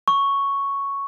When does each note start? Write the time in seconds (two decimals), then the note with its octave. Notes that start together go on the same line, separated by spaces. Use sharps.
0.08 C#6